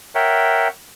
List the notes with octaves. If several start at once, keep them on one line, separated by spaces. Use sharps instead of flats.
A#4 C#5 E5 F#5 G5